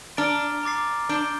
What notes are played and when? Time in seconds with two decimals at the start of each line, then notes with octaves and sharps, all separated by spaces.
0.17 D4 A#5 F6 A6 D7 G7
0.63 A#5 D6 A6 C7
1.09 D4 G6 D7 G7